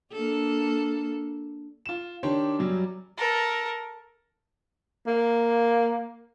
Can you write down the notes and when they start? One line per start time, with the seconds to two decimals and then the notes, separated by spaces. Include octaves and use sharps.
0.12 A#3 D4 A4
1.86 F4 E7
2.23 D#3 D4 G4 C#5 C6
2.59 F#2 F#3 G3
3.17 A4 A#4
5.07 A#3